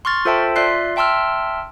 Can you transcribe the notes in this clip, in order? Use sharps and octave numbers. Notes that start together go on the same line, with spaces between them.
C6 C#6 F6 A6
F4 A4 C5 E5 G5 A5
F4 D5 E5 C6 F#6 C7
E5 G5 A5 C6 E6 F6